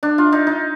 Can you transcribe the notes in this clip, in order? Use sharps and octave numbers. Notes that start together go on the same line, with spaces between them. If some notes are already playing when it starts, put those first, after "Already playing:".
D4
F4
D#4
D#4